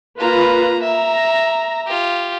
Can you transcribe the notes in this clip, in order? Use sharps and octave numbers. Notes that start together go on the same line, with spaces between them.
A#3 F4 B4 A#5
E5 A#5
F4 G4